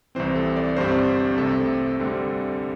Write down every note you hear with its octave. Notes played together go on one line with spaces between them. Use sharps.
C2 C3 E3 C4 C5
A4
D5
G1 G2 G3 C4 C5
C2 C3 A3 C4 A4
D2 D3 G3 C4